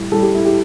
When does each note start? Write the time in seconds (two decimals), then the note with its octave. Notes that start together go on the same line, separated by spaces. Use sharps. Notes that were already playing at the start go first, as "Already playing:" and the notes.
Already playing: A2 G3
0.11 A2 G3 A4
0.22 G4
0.35 E4
0.45 G4